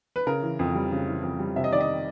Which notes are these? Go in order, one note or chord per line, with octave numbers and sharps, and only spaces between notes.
B4
C#3 A#4
E3
F2
G3
C#3
E3
F2
G3
C3 E5
D#5
D#3 D5
D#5